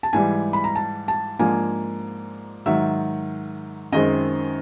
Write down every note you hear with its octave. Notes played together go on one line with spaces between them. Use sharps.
A5
G#2 E3 G3 G#5
B5
A#5
A5
A5
G#2 F3 A#3 D4 G#5
G#2 D#3 F#3 E5
F#2 D#3 G#3 C4 D#5